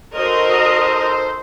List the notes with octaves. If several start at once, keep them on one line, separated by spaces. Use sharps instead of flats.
D#4 F#4 A4 A#4 C5 D#5